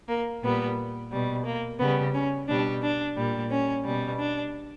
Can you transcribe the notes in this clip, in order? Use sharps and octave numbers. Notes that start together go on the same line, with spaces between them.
A#3
A#2 G3 B3
B2 G3
A#3
C#3 G3 B3
C#4
B2 G3 D4
D4
A#2 G3
C#4
B2 G3
D4